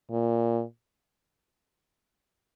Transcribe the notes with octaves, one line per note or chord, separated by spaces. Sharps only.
A#2